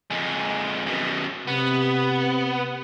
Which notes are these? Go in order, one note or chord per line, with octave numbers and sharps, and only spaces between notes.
F2 G#3
F#2 B2
C3 B3